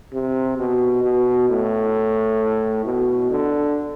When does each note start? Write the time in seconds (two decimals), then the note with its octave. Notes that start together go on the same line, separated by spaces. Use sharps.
0.13 C3
0.58 B2
1.04 B2
1.49 A2
2.85 B2
3.30 D3